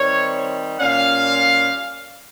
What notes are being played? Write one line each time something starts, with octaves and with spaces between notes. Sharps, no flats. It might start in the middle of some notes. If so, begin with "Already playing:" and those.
Already playing: D#3 G3 C4 C#5
A#2 G3 C#4 F5